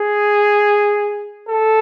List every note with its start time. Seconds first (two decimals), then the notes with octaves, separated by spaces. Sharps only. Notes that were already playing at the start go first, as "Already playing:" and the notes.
Already playing: G#4
1.48 A4